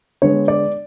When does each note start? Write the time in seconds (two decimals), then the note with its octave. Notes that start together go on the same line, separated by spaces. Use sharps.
0.22 D3 G#3 B3 C#5
0.48 D5